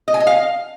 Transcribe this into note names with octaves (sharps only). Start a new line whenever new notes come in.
D#5
G#5
D#5
F5